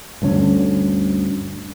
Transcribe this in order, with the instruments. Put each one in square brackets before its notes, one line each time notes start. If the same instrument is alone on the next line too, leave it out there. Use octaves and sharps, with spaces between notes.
[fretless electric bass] D2 G2 D3 C#4